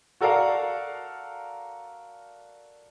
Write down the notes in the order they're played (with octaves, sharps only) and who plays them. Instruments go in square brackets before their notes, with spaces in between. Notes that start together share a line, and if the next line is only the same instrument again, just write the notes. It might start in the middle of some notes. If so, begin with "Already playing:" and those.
[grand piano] F#4 A4 A#4 D5 F5 F#5